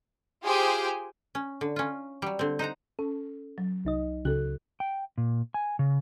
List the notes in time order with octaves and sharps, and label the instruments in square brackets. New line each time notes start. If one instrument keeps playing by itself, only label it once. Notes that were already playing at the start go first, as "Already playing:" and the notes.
[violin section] F4 G4 G#4 C5 G5 G#5
[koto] C#4
D3
C#4 F4
F#3 G3
D3 C4
D#4 C5 F#5 A#5
[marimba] C#4 [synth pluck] A4
[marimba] F#3
[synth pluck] C2 D#4 D#5
[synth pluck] C#2 C#3 F#6 [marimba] F#4 A4
[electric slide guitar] G5
A#2
G#5
C#3